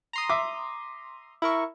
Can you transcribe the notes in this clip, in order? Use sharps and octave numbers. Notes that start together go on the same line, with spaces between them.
A#5 C6 D#6
E5 D6
E4 A#4 C#6